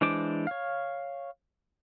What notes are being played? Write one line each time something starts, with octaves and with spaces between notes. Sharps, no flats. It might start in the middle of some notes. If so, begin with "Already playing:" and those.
E3 G#3 D4 C5 D6
C#5 F5